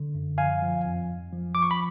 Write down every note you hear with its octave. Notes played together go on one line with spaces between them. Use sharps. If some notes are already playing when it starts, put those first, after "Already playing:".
Already playing: D3
F#2
F3 F5 G#5
F3
F2
F2
F3
F3 D6
C#6
B5